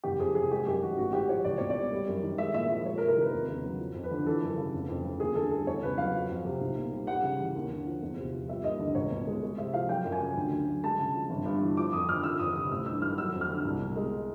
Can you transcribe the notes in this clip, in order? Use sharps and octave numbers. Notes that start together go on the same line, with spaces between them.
F#1 G4
F2 G#4
C3 G#4
G#3 G4
F#2 G4
D#3 F#4
A1 F#4
G#2 G4
F3 C#5
C#2 D5
B2 C#5
D5
G3
G3
F#2
D#3
G#3 E5
A#2 E5
F3
G#3 C#5
A#4
C3
A#4
D#3 B4
E2
C#3
F#3
F3
F2
B4
D3
E3 A4
F#2
C#3
F1
F2
C#3
D#2 G#4
D3 A4
G3 A4
E2 C#5
C#3 B4
F#3 F5
F3
F2
C3
B1
A#2
G3
G3 F#5
C#3
E3
D#2
D3
F3
E2
C3
F3
G3 E5
D#2 D#5
D3
C#2 C#5
B2
G#3
G#3
C3 E5
F3 F5
F#3 G5
F#2
G#5
C#3
D2
D3
F#3
G#3 A5
C#3
F3
G1
G2
E3
F3 D6
F2 D#6
D3 F6
D#3 E6
F2 D#6
C3 D#6
A1 E6
G2 E6
D#3 F6
F#3 E6
F2
F6
D3
C2
B2
G#3